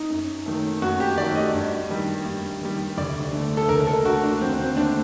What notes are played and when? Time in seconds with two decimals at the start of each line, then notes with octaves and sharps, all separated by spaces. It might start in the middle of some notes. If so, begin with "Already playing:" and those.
Already playing: D#4
0.10 F#2
0.46 D#3 F#3 A3
0.82 F#2 F#4
1.00 G4
1.17 D#3 F#3 A3 D5
1.35 D#5
1.54 G2
1.90 D#3 G3
2.25 G2
2.61 D#3 G3
2.98 D2 D5
3.33 D3 A3
3.57 A4
3.68 D2 A#4
3.80 A#4
3.87 A4
4.05 D3 A3 F#4
4.23 D4
4.41 D#2 C4
4.59 C4
4.76 D3 A3 D4